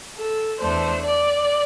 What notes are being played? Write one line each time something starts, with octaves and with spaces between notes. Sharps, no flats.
A4
E2 E3 A3 D4 C5
D5